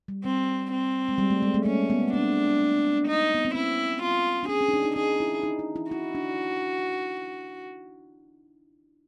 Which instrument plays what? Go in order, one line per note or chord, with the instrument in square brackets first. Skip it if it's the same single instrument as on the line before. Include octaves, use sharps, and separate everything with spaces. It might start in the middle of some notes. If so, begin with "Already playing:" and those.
[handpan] G3
[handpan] G3 [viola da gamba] C4
[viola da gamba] C4
[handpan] G#3
G3
A3
G#3
A3
[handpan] A#3 [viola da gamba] C#4
[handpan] B3
[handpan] C4 [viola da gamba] D4
[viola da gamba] D#4
[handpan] B3
C4
[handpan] C#4 [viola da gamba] E4
[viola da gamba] F4
[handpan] D4
[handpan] C#4 [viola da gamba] G#4
[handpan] C#4
D#4
D4
D#4
[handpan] D#4 [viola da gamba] G#4
[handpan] E4
D#4
E4
E4
[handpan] E4 [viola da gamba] F#4
[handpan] D4